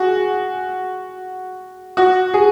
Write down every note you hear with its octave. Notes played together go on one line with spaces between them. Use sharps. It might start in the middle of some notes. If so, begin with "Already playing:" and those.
Already playing: F#4 G#4
F#4
G#4